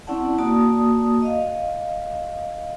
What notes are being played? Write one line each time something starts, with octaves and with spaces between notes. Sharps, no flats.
C4 C#4 E4 D5 F#5 A5
A#3 F#4 D5 A5 D#6
D#5 F5